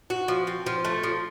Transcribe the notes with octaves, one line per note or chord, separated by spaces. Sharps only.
F#4
F3
C4
F3
A3
F3